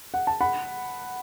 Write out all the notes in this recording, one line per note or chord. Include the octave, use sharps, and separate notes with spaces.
F#5
A5
F#5 B5